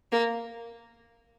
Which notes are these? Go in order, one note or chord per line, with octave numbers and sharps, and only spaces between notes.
A#3